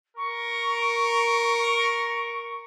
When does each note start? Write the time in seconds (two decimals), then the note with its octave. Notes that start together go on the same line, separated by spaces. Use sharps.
0.17 A#4 C#6